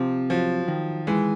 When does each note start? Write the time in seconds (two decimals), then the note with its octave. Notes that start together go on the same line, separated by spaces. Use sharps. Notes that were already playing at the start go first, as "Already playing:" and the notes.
Already playing: C3 F3
0.30 F3 F#3
0.68 D#3
1.07 E3 G#3